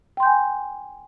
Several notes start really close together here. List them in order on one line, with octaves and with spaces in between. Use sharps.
G5 C6 G6 G#5